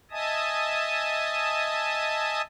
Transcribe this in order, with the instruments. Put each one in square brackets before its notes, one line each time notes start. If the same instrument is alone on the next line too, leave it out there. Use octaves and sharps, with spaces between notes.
[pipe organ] D#5 E5 G#5 A5 D#6